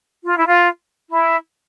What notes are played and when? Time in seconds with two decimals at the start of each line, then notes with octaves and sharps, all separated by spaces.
0.24 F4
0.36 E4
0.47 F4
1.10 E4